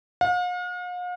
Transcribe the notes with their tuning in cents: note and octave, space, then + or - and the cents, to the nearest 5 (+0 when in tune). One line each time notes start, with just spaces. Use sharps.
F5 +45